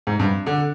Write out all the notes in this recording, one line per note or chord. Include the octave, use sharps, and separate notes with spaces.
G#2
G2
D3